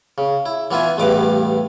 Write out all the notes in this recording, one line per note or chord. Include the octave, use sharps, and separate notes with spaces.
C#3
E4
E3 B3 F4 E5 G#5
A1 E2 G2 B4 F5 D6